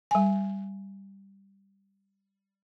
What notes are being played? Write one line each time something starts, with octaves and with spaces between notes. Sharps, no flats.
G3 G#5